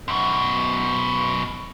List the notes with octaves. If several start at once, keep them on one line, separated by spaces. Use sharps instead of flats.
F#2 B2